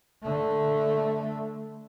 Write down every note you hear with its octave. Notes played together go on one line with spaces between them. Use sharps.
D3 A3